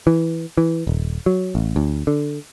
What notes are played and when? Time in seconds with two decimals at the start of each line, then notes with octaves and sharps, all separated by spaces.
0.07 E3
0.57 E3
0.87 D#1
1.26 F#3
1.55 A1
1.76 D2
2.07 D3